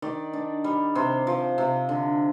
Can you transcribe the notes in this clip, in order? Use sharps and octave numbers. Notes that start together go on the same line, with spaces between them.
D#3 D5
D4
G3
C3 C5
F3
C3
D3